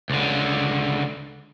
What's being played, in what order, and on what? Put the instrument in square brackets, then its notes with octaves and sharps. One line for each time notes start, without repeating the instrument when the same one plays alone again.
[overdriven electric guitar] C#2 D3